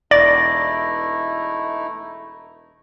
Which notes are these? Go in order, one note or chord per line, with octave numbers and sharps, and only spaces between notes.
E1 A3 D#4 E4 D5 A#6